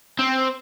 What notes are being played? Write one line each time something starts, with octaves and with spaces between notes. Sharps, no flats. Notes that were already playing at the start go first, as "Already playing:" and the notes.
C4